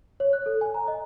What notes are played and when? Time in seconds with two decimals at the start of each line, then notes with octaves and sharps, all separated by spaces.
0.20 C#5
0.33 F#6
0.46 A4
0.61 G#5
0.74 A#5
0.88 D#5